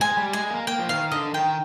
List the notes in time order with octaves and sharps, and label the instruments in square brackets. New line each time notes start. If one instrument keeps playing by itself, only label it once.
[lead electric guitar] G#3 [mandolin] G#5
[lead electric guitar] G3
[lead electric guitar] G#3 [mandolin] G#5
[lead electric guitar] A#3
[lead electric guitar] A#3 [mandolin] G5
[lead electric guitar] F3
[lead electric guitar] D#3 [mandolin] F5
[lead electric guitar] D3 [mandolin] D#5
[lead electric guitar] D#3 [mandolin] G5